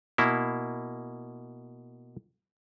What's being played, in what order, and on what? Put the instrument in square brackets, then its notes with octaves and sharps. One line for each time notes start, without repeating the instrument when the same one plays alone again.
[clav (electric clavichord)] B2 A#3 E4